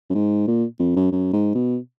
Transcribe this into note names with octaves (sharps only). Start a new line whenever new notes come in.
F#2
G#2
A#2
F2
F#2
F#2
G#2
B2